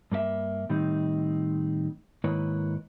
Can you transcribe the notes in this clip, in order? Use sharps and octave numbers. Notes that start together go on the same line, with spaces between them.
G2 A#3 A4 E5
A2 D#3 G3 C4 D#4
G#2 D#3 A#3 E4 B4 C#5